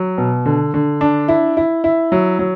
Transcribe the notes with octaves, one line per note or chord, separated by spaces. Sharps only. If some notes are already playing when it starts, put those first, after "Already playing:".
Already playing: F#3
B2
D3
D3
D4
E4
E4
E4
F#3
F#3